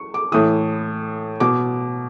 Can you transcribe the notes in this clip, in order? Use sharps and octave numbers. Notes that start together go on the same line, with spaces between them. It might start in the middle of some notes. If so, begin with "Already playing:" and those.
Already playing: C#6
D6
A2 E3 D#6
B2 D6